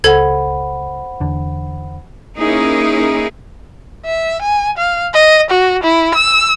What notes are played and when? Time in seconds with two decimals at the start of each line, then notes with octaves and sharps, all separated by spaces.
0.04 C#2 A4 C5 F#5 B5 G#6
1.20 E2 D3
2.37 A#3 C#4 D#4 E4 G#4 A#4
4.05 E5
4.42 G#5
4.77 F5
5.14 D#5
5.51 F#4
5.84 E4
6.14 E6